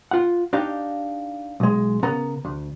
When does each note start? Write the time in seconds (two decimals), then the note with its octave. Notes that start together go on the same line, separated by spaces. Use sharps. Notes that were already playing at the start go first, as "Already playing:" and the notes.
0.11 F4 F#5
0.53 D4 D#4 G4 F5
1.60 B1 G#3
2.03 C#3 B3 A#4 F#5 A#5
2.45 D2